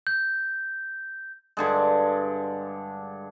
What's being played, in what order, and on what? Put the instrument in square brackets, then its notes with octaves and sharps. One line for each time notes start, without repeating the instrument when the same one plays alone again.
[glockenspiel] G6
[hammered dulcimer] G2 D3 G#3